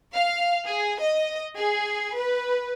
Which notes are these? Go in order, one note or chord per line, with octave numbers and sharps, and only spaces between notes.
F5
G#4
D#5
G#4
B4